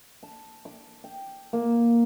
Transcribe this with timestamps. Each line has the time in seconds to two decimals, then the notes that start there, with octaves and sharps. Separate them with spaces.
0.23 A5
0.65 D6
1.04 G5
1.53 A#3